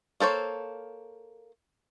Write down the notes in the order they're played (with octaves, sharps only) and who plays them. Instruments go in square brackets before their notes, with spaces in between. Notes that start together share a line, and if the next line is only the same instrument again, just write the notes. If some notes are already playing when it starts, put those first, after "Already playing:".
[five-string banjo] A#3 A4 C5 C#5